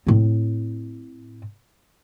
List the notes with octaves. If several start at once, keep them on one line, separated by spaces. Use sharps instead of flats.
A2 C4